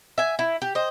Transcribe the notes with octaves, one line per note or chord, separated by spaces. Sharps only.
E5 G#5
E4
G4
C5 D#5